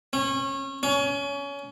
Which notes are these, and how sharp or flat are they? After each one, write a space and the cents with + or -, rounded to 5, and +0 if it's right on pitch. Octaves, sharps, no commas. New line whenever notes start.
C#4 -25
C#4 +25